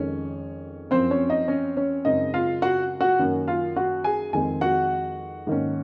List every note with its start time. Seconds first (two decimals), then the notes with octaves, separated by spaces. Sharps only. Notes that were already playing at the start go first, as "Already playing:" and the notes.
Already playing: F2 D#3 G#3 C#4 C#5
0.91 F#2 F3 C4 C5
1.11 C#4 C#5
1.29 D#4 D#5
1.48 C#4 C#5
1.77 C#4 C#5
2.05 F#2 C#3 G#3 C4 D#4 D#5
2.34 F4 F5
2.62 F#4 F#5
3.01 F#4 F#5
3.19 F#2 D#3 A#3 C#4
3.48 F4 F5
3.76 F#4 F#5
4.04 G#4 G#5
4.33 F2 D#3 G#3 C4 G#4 G#5
4.61 F#4 F#5
5.47 G#2 D#3 A#3 C#4